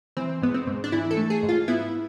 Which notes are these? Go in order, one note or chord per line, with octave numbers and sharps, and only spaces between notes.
E3 C4
G#2 B3
C4
G#2
D4
E3 E4
A4
A3
G#4
G#2
F4
B3 E4